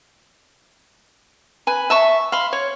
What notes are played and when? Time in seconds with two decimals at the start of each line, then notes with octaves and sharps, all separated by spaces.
1.67 B4 G#5
1.90 E5 A5 C#6
2.32 F5 B5 C6
2.53 C#5